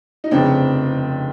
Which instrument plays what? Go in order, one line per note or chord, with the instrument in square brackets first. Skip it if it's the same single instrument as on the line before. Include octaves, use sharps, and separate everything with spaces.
[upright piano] D#4
[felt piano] F1 F2 C#3 [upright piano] C4 D4